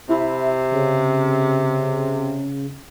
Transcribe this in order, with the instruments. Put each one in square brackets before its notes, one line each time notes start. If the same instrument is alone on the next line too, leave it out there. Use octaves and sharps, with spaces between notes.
[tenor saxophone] C3 [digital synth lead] E4
[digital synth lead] C#3